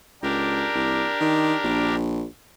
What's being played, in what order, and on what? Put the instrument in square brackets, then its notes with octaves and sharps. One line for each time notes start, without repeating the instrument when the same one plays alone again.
[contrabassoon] C#2 [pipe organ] D4 G4 A#4
[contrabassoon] C2
D#3
A#1